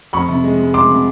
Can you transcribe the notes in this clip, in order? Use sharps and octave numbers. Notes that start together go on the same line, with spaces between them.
F2 B5 C#6
C3
G#3
G#3
G#3 C6 D6
C3